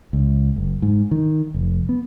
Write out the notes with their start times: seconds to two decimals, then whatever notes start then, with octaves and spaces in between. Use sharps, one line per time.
0.13 C#2
0.56 F#1
0.82 G#2
1.11 D#3
1.54 F1
1.89 B3